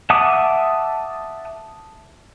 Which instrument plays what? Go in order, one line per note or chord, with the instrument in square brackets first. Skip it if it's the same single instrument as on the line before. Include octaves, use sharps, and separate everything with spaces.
[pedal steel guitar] E5 F#5 A5 D6 D#6